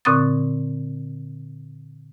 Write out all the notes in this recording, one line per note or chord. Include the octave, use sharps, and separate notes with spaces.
A#2 D3 C4 C#6 D#6 A6